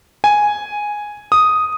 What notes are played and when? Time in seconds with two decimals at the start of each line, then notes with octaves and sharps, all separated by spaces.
0.24 G#5
1.32 D#6